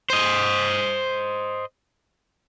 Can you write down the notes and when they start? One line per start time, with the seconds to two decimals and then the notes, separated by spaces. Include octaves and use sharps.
0.10 C5 D#5